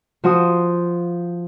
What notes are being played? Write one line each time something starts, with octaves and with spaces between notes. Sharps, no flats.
F3 F#4 C5 D#6